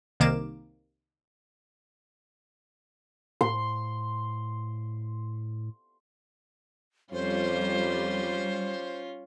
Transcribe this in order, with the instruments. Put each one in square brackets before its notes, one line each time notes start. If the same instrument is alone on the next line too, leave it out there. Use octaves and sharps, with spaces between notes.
[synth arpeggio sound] C2 C3 D#3 A#3 D6 E7
[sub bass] A2 [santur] C6
[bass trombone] F2 [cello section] G3 [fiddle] C#4 F4 [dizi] C5